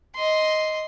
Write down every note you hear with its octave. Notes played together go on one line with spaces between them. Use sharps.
D#5 C6